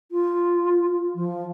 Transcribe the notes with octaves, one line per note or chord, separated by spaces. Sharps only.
F4
F3